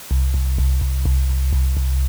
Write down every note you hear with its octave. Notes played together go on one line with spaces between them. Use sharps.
C2
C2
C2
C2
C2
C2
C2
C2